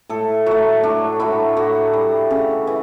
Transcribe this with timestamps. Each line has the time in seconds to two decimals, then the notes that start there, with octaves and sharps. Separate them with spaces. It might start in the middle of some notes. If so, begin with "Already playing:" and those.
0.09 A2 A4
0.46 F#3 A3 F#4
0.83 A2 D4
1.20 F#3 A3 E4
1.57 A2 F#4
1.93 G3
2.31 C#3
2.67 E3